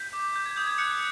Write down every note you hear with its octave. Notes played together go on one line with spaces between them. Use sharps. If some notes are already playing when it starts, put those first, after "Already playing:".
Already playing: G6 B6
D6
G6
G#6
D#6 G6
G#6
F#6 C#7